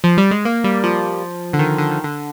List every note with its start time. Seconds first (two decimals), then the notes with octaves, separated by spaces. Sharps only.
0.04 F3
0.18 G3
0.31 G#3
0.45 A#3
0.64 G3
0.84 F3
1.53 D3
1.59 D#3
1.78 D3
1.91 D#3
2.04 D3